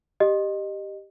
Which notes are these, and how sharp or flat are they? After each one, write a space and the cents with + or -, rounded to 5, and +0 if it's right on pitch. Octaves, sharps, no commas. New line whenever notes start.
G4 +0 D#5 -20